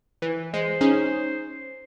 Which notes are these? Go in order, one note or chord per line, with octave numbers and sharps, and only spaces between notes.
E3
G#3 C5
C#4 D#4 G#4